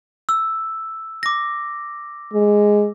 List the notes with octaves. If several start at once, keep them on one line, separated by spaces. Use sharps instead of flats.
E6
D6 A#6
G#3